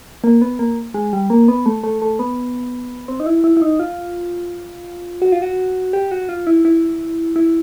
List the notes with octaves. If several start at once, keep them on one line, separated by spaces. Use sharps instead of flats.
A#3
B3
A#3
G#3
G3
A#3
B3
A3
A3
A3
B3
C4
D#4
E4
E4
E4
D#4
F4
F#4
F4
F#4
G4
F#4
F4
E4
E4
E4